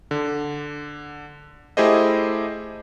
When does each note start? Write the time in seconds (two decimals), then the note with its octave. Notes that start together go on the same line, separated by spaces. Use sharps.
0.11 D3
1.77 A3 E4 G4 G#4 C5 D#5